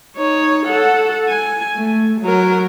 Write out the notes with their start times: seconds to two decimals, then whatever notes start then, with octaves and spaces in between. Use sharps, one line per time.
0.17 D#4 C#5
0.66 A4 F#5
1.29 G#5
1.75 A3
2.21 F#3 A#4